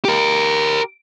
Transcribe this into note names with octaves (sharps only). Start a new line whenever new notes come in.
G4 A#4